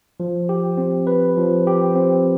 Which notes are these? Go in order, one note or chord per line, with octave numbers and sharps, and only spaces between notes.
F3
G4
C4
B4
F3
G4
C4